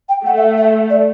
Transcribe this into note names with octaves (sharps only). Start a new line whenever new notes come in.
G5
A3 F#5
E5
E5
D5